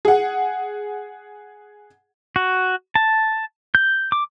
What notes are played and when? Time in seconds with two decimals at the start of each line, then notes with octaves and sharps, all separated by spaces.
0.05 G#4 F#5
2.36 F#4
2.95 A5
3.75 G6
4.12 D6